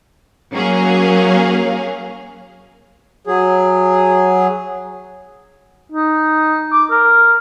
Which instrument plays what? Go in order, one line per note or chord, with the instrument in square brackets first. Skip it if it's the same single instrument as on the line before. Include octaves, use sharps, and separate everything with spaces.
[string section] F#3 A#3 C#4 G#4 F5
[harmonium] F#3 G#4
[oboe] D#4
D6
A#4